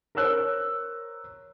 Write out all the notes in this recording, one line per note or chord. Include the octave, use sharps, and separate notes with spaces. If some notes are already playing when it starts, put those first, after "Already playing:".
A#4 C5 C#5 E6 F#6